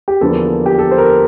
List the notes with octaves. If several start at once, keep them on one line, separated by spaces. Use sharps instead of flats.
G4
E2 D3 F3 A#3 A4
G4
A4
C5
A#4